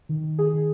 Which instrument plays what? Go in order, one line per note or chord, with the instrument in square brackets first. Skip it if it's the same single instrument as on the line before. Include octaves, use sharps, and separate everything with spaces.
[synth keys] D#3
D#3
D#3 G#4
D#3